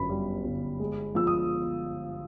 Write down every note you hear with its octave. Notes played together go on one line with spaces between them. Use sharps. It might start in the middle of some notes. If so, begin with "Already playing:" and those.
Already playing: G1 F#2 B5
G3
G1
G#3
F3 E6
D#6